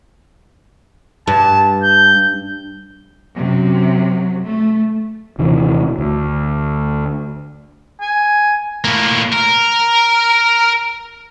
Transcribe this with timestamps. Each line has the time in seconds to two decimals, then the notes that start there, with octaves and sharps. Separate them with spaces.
1.28 G2 A5
1.83 G6
3.36 F#2 C3 F#3
4.44 A3
5.38 D#1 C3 D#3 E3
5.98 D2
8.01 G#5
8.84 A2 A#3
9.33 A#4